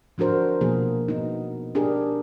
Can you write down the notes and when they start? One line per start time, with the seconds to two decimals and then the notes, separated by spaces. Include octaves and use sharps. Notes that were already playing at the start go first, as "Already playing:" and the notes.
0.18 F3 D4 F#4 A#4 C5
0.61 B2 F3 A#3 G#4
1.08 B3 D#4
1.75 D4 G4 G#4 A#4